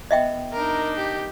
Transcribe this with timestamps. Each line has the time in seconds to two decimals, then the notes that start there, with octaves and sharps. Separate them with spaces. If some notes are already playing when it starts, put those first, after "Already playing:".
0.11 B3 D#5 E5 G5
0.53 D4 D#4 A#4
0.96 G4